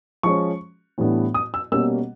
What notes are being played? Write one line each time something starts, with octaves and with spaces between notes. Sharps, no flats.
F3 G#3 C#4 C#6
A2 E3 G3 B3 D4
D#6
E6
B2 G3 A#3 C#4 E6